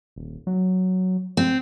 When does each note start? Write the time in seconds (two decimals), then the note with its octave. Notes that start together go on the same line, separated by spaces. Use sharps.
0.16 D#1
0.47 F#3
1.37 C4